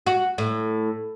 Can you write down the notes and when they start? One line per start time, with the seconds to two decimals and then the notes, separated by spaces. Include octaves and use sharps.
0.07 F#4
0.38 A2